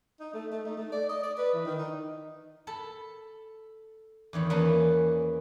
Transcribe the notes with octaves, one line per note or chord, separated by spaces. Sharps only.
D#4
A3
A3
D#4
A3
D5
D#5
D5
B4
E3
D#3
D#4
A4 A5 B5
E2 D#3 C#5 B5
E2 A#3 C#4 B4 A5 B5